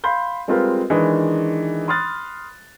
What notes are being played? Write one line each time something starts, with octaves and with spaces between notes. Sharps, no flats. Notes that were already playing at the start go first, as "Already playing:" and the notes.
F5 B5 C6 G6
G3 G#3 C4 F4 A#4 B4
D#3 E3 G#3 D4 D#4
B5 C6 D#6 F6 F#6 A6